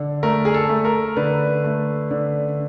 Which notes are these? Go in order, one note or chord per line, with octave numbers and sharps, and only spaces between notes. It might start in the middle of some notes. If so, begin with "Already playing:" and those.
Already playing: D3
A3 A#4
G#4
A4
A3
A#4
D3 B4
A3
D3